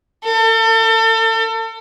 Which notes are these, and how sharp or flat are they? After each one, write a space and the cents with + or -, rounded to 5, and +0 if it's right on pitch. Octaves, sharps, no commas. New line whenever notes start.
A4 +35